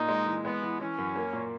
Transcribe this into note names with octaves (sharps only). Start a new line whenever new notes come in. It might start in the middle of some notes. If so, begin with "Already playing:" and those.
Already playing: A#2 D#4
G#3
E3
G#3 B3
E3
E3 C#4
F#2
A#3
A#2